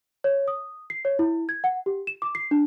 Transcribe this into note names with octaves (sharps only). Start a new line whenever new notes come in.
C#5
D#6
C7
C#5
E4
G#6
F#5
G4
E7
D6
C7
D4